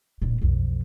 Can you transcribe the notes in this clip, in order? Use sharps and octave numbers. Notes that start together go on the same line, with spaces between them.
D1 A#2
B1 F2